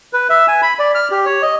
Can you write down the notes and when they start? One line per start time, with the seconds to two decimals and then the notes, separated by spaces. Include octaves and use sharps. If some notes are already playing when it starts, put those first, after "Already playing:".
0.13 B4
0.30 E5
0.48 G#5
0.62 B5
0.79 D5
0.95 F6
1.11 G4
1.26 C#5
1.42 D#5